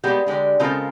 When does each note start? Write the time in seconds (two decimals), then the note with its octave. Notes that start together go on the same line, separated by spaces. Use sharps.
0.03 G3 G#3 A#3 B3 G4 G#4
0.27 D3 G#3 G4 D5
0.60 C#3 G#3 C4 F4 A4 A#4